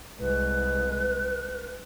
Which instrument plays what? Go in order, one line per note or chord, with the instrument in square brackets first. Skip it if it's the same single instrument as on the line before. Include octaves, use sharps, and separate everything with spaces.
[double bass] C2 G#3 [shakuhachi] B4